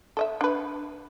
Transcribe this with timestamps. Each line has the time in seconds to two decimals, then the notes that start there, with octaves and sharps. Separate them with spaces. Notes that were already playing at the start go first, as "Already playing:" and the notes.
0.17 A4 D#5 E5
0.41 D4 B4